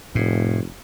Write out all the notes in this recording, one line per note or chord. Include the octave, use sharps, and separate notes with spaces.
F1 A2